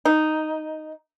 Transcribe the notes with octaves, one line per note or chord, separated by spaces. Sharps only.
D#4